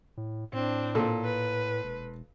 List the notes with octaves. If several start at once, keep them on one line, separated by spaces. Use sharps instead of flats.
A2
A2 C4 D4
A#2 A4
B4
E1